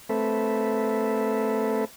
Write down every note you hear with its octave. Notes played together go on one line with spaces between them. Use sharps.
A3 C4 A4 B4 E5